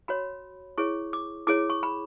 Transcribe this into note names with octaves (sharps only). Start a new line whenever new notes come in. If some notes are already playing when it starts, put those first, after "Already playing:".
F#4 C#5 B5
E4 G#4 C#5 C#6
D6
E4 G#4 C#5 D6
C#6
B5